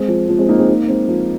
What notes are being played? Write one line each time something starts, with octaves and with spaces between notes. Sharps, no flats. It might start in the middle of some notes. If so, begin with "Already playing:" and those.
Already playing: G#3 C4
F3
F3
G#3 C4
A#3 D#4
G#3 C4
A#3 D#4
G#3 C4
F3 A#3